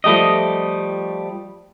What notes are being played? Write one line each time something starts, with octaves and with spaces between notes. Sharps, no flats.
F3 G3 A3 G4 D#5